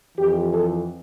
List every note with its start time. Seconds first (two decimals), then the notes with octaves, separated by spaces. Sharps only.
0.17 F2 E3 G4
0.53 A4